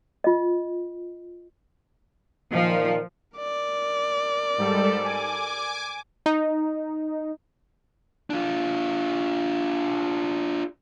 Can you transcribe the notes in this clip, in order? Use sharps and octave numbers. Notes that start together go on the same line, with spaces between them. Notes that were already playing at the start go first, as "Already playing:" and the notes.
F4 D#5
A#2 D#3 F3
A#4 D5
G#2 G3 A4
G#5 D6
D#4
D4 F4